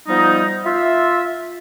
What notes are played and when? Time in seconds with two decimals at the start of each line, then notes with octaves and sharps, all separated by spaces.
0.08 F3 G3 B3 D#4
0.65 F4 E5